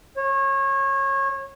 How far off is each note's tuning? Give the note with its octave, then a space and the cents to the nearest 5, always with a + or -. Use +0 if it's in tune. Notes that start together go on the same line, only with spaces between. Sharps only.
C#5 -25